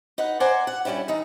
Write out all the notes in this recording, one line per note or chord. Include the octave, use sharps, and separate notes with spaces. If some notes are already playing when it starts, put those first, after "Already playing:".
D#4 B4 F#5
C5 D5 F#5 G#5 A#5
F#5
G2 A#2 G3 C#4 E4
E3 D#4 A#5